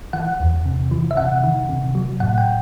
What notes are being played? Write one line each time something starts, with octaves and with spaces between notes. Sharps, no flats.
E3 F#5
E2
C3
E3
E5
C3 F#5
D#3
C3
F#3
A2 F#5
G5